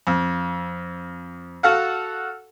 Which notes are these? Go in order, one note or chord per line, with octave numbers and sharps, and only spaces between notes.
F2
F#4 A4 F5 F#5